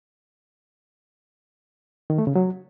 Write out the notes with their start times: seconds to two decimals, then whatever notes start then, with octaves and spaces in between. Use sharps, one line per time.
2.10 D#3
2.18 A3
2.27 C#3
2.35 F#3